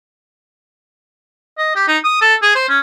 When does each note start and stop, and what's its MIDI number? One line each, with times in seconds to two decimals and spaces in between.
1.58 1.74 75
1.76 1.85 67
1.88 1.98 63
2.04 2.17 87
2.21 2.35 69
2.42 2.50 68
2.55 2.65 72
2.69 2.79 61